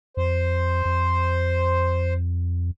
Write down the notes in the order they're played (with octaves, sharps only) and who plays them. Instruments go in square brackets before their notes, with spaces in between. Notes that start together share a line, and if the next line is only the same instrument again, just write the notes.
[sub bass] F2 [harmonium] C5
[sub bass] F2